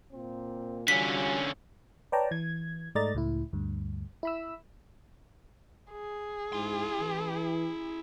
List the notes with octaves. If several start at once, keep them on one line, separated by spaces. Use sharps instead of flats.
A#2 A#3 C4
D3 G3 C#4 F4 F#4 B6
B4 C#5 D5 G5 A5 A#5
E3 G#6
G#2 A3 D5 D#5 A#5 A6
C#2 A2 E4
D2 G2
E4 B5 E6
G#4
G#2 E4 C6
E3